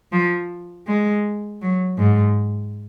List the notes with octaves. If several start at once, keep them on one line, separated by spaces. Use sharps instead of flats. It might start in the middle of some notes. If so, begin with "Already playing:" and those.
F3
G#3
F#3
G#2